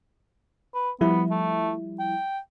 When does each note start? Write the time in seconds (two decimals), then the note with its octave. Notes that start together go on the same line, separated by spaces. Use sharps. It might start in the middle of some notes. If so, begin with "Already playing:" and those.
0.74 B4
1.01 F3 G3 B3 E4
1.31 A3
1.99 G5